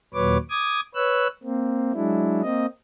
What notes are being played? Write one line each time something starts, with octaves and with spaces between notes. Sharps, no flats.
D#2 A#2 F#3 B4 C#5 D6
D6 D#6 G#6
B4 C#5 E6 F#6
A#3 C4
F#3 G#3 D4 E4
A#3 C4 D#5